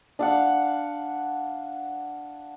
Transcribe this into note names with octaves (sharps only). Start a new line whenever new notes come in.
D4 F5 F#5